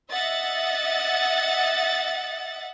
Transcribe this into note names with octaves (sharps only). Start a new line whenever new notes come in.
D#5 E5 F#5 A6